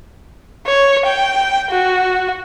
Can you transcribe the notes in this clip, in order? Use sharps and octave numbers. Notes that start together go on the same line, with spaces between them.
C#5
G5
F#4